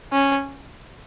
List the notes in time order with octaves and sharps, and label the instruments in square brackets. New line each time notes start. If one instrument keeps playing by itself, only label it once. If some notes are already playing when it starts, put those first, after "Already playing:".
[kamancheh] C#4